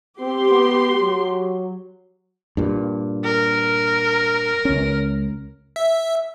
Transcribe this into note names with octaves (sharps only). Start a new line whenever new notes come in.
C4 G4 C6
B3
F#3
G2 A#2
A#4
C#2 C#4
E5